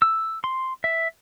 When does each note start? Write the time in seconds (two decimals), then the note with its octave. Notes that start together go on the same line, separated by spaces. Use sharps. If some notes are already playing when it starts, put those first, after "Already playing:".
0.02 E6
0.44 C6
0.84 E5